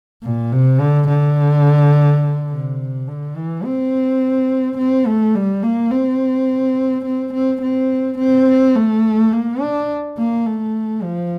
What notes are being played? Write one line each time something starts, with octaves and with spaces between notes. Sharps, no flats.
A#2
C3
D3
D3
C3
D3
E3
C4
C4
A3
G3
A#3
C4
C4
C4
C4
C4
A3
A#3
D4
A#3
A3
F3